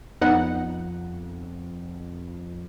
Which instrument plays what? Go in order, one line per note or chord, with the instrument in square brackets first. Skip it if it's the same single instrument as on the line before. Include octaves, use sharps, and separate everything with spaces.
[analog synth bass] F2 [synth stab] B3 D#4 F#5